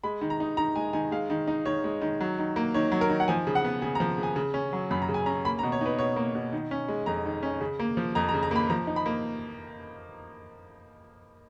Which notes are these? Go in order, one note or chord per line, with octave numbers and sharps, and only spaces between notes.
G#3 B5
D#3
A#5
D#4
D#3 A#5
G#3 G#5
D#3 G#5
G#3 F5
D#3
D#4
D#3 C#5
G#3
D#3
F#3
D#3
A#3
D#3 C#5
F#3
A#4
D#3
F#5
F3 G#5
C#3
F#5
B3
C#3 G#5
A#5
F3
C#3
G#5
C#3
C#4
F#3
F#2 B5
A#5
C#3
G#5
C#4 A#5
A#3 B5
A#5
B2
C#5
D#4 B4
B2 C#5
A#3
B2
D#3
C#4
G#3
F2 A#5
D#3
C#4
C#3
A#3
F3
F2 A#5
A#5
C#3
A#5
A#3 B5
F3 A#5
D#4
B5
A#3